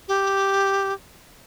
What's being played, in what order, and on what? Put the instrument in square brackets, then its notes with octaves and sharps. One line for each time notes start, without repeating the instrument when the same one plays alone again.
[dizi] G4